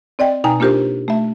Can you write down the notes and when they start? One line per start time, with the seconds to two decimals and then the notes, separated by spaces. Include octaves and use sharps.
0.19 C4 D5 D#5 G5
0.44 B2 D#4 G5 G#5 A#5
0.60 A#3 D4 F4 G4 A#4 C5
1.08 A3 E5